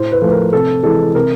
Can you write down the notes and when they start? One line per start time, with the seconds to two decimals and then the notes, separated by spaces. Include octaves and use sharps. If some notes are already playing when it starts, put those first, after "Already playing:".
Already playing: A2 C5
0.12 B4
0.22 F3 A3
0.28 B4
0.32 A#4
0.53 C3 A4
0.83 E3 G#3 A4
1.15 C3 A#4